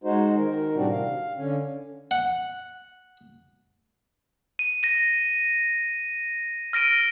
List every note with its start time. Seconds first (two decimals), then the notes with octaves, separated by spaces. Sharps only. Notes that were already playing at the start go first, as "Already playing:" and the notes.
0.04 G#3 D#4 F#4 C5
0.37 D#3 A#4
0.75 A2 C3 G3 C4 D4 F#4
0.91 F5
1.37 D3 C#4
2.11 F#5
4.59 D#7
4.83 A#6 D#7
6.73 F6 A#6 D7 D#7